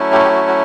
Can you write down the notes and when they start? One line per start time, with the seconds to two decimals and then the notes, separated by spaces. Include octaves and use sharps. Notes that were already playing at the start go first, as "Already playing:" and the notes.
Already playing: F#3 A3 C#4 E4
0.12 G4
0.24 G4
0.36 F#4
0.48 F#4